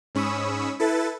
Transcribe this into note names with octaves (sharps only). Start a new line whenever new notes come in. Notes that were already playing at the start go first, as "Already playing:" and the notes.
G#2 C#4 B5 C#6 D#6 E6
E4 A4 B4 A6